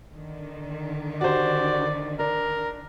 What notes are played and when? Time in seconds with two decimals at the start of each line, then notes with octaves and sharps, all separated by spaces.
0.13 D3 D#3
1.21 F#4 G4 C5 D5
2.19 D4 A#4